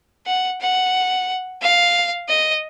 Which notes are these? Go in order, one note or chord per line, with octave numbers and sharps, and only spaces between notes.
F#5
F#5
F5
D#5